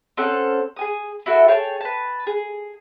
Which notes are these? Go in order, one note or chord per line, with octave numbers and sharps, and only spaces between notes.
C4 C#4 A4 F#5
G#4 G#5 D#6
E4 F#4 A4
G#4 C#5 G5 A5
B4 A5
G#4